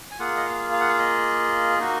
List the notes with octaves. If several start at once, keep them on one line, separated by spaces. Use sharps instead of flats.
G#5
A#3 F4 G#4 F#5
D#5
F5
F5
F#5
F5
D#5
A#3 D#4 F#4